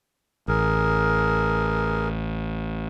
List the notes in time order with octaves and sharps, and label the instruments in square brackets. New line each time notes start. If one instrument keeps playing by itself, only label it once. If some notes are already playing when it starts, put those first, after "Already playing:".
[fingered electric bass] A1 [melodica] G#4 A#4